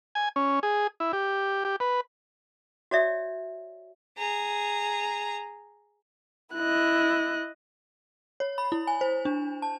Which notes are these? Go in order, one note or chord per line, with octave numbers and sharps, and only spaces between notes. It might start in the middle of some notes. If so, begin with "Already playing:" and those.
G#5
C#4
G#4
E4
G4
G4
B4
F#4 C#5 D5 E5
G#4 A#5
E4 D#5 F#6
C#5
B5
E4
G#5
C5
D4
A5